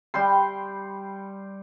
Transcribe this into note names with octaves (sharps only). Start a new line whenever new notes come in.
G3 G5 C6